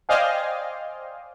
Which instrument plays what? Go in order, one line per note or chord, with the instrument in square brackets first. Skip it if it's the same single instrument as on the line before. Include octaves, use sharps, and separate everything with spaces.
[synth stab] C5 D5 D#5 F5 G5 G#5